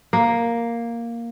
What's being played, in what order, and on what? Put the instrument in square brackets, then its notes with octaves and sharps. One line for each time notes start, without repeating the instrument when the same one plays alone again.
[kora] A#3